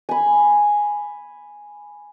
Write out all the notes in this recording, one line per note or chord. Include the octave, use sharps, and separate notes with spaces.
G#5 B5